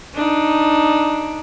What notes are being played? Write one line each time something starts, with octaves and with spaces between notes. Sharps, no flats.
D4 D#4